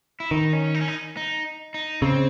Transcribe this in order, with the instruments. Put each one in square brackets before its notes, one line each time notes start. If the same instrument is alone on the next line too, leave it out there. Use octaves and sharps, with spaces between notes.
[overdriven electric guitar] E4
[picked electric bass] D#3 [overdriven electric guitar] D#4
[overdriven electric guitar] C#4
D#4
C#4
D#4
D#4
D#4
[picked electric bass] C#3 [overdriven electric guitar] C4